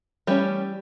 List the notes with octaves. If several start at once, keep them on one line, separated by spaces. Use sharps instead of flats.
E3 G3 A3 C#4 G4